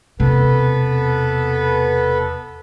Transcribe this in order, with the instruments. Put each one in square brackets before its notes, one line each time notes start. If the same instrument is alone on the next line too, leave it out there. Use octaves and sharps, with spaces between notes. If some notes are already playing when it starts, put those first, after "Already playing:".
[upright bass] E1 C3 [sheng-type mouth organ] B3 A4 B4